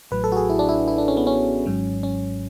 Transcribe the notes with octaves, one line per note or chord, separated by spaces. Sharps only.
A1 A2 F#3 B4
A4
F#4
G#4
E4
D4
E4
E4
D4
C#4
B3
C#4
G#1 G#2 F#3
C#4